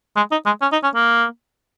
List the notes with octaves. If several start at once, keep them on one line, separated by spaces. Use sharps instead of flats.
G#3
D#4
G#3
C#4
D#4
C#4
A#3